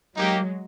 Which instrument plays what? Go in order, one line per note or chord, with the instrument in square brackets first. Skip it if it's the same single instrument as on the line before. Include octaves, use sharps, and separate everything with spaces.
[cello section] F#3 G#3 [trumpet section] A#3 D#4 G4